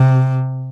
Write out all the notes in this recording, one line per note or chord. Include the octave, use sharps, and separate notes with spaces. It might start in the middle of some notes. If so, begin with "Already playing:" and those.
Already playing: C3